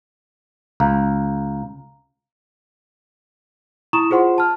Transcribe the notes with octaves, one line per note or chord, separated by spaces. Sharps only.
C#2 F5 A#5
E4 A#5 C#6 D#6 E7
F4 G#4 C5 F#5 C6
A5 F6